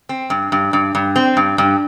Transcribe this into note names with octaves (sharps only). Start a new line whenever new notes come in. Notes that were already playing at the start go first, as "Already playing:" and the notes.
C4
G2
G2
G2
G2
C4
G2
G2